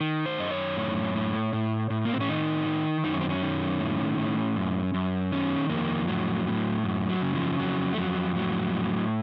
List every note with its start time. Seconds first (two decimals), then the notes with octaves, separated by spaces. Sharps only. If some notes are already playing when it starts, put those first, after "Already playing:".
0.01 D#3
0.26 C5
0.39 F#2 D#5
0.51 C#5
0.77 A2
1.14 A2
1.53 A2
1.90 A2
2.05 A#3
2.13 C4
2.21 C#4
2.28 D#3 D#4
2.66 D#3
3.04 F#2 D#4
3.13 C#4
3.21 C4
3.30 C#4
3.42 D#3
3.80 A2
4.18 A2
4.56 F#2
4.94 F#2
5.32 D#3 C#4
5.70 F2 A#3
6.08 A2 F#3
6.46 A2
6.84 F#2
7.09 F#3
7.22 C#3
7.35 F3
7.60 F2 F#3
7.94 A3
7.98 F2 F#3
8.36 A2 F#3
8.73 A2